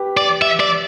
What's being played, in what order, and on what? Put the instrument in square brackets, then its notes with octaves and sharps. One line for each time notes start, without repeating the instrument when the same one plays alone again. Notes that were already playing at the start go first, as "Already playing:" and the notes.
Already playing: [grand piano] G4 B4
[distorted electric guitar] D5
E5
D5